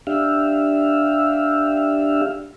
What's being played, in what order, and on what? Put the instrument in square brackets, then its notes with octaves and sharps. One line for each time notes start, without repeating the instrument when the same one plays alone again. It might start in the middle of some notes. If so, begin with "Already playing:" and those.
[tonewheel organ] D4 G4 E5 F5